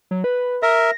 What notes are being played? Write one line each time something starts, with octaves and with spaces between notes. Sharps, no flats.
F#3
B4
A#4 E5 A#6